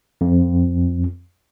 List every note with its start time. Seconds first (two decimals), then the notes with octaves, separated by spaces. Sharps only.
0.21 F2